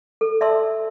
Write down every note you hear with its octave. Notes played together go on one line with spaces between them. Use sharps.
A4
D5 E5 A5 C6 E6